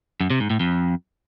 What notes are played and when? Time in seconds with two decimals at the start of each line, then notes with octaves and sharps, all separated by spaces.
0.21 F#2
0.30 C3
0.40 G#2
0.50 A2
0.60 F2